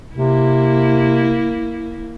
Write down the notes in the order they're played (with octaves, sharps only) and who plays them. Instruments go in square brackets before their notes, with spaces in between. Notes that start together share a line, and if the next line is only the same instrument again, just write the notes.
[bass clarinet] C3 [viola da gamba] A#3 E4